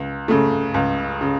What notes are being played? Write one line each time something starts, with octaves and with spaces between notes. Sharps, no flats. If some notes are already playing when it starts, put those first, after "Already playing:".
Already playing: C#2
C#3 A3
C#2
C#3